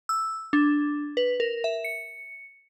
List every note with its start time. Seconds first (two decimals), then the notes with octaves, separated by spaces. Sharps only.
0.09 E6
0.53 D4
1.17 B4
1.40 A#4
1.64 E5
1.84 C#7